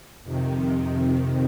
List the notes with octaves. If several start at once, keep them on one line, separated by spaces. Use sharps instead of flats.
F2 C3 D#3